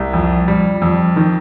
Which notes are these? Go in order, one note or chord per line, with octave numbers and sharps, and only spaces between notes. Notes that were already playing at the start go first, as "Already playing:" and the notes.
Already playing: C2
F2
G3
F2
D#3